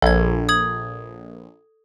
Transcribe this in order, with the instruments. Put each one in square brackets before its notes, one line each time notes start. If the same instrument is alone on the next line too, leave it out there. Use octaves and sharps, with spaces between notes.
[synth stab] A#1 [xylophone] A4 G#6
[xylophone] D#6 G#6 F#7